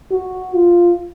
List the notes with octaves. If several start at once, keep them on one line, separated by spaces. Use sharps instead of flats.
F#4
F4